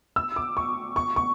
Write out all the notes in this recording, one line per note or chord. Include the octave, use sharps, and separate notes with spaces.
E6
D6
C#6
C#6
C#6